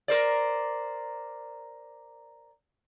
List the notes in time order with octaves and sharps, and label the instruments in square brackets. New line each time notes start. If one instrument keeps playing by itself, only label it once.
[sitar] A#4 C5 D5